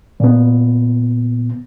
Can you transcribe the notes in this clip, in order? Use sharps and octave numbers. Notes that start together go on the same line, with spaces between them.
A#2 B3